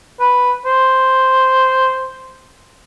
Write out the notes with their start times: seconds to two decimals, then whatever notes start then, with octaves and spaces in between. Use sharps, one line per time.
0.20 B4
0.66 C5